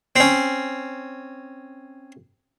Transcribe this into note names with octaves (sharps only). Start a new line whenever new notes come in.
C4 C#4